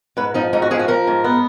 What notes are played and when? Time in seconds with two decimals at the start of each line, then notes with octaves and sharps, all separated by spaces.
0.17 G#2 B4
0.34 F3 D#4
0.53 G#2 D#4
0.62 F#4
0.71 F3 G#4
0.79 F#4
0.88 F3 A#4
1.07 G#2
1.24 B3